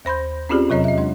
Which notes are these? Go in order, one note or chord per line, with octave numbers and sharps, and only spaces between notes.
D#2 C5 B5 C6 G6
C4 C#4 F4 G4 G#4 D5
E2 C3 F#3 C#5 D#5 A#5
D#5 E5
G#3 D4